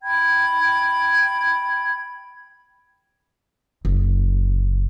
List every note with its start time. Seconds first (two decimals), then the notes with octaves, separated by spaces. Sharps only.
0.03 G5 B5 G#6
3.85 F#1